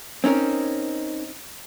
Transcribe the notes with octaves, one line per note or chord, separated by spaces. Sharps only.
C4 C#4 D#4 A#4